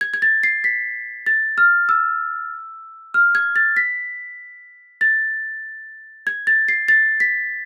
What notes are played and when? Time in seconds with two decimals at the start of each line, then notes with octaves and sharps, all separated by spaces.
0.01 G#6
0.14 G#6
0.22 A6
0.43 C7
0.64 B6
1.26 A6
1.58 F6
1.89 E6
3.14 F6
3.35 G#6
3.56 A6
3.77 B6
5.01 A6
6.27 G#6
6.47 A6
6.68 C7
6.88 A6
7.20 B6